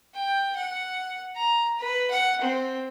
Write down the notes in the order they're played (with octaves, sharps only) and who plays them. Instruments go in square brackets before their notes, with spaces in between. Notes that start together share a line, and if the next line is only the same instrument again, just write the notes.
[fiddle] G5
F#5
A#5
B4
F#5
C4